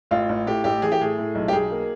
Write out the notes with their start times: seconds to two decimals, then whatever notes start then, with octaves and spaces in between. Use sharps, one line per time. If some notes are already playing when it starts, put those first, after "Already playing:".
0.11 A1 F4
0.29 A1
0.47 A2 G4
0.64 A1 G4
0.82 E3 G#4
0.92 G4
1.00 A2 G#4
1.18 A2
1.35 B1
1.48 G4
1.53 B1 G#4
1.70 A#3